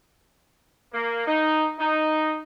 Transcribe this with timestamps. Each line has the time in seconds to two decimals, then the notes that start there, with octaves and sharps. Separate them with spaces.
0.93 A#3
1.26 D#4
1.79 D#4